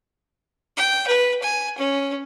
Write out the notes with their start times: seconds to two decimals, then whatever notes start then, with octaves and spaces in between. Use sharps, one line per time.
0.77 G5
1.08 B4
1.43 G#5
1.78 C#4